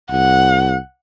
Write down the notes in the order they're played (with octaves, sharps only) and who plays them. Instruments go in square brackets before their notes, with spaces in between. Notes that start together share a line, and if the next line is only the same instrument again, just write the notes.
[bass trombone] C2 [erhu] F#5